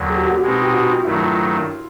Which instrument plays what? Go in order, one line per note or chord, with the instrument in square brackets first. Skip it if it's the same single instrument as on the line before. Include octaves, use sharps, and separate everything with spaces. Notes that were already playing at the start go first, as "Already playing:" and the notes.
Already playing: [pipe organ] D#2 D3 F#3
[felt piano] G#4
G4
F#4
G4
[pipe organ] B2 G#3 C4 D#4
[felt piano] G4
F#4
F4
[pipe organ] G2 D#3 F#3 A3 [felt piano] E4
[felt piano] F4